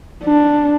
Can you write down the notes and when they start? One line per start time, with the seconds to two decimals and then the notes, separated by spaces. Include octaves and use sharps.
0.24 D4